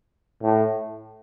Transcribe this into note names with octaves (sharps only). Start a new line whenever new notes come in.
A2